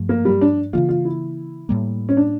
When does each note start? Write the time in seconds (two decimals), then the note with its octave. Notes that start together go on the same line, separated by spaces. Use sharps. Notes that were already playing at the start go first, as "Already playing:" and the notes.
Already playing: G2 F3 A3
0.09 A#3
0.25 G3
0.41 D4
0.73 C#3 E3 A#3 F4
0.89 F4
1.05 E4
1.69 A2 G3 A#3
2.09 C#4
2.17 D4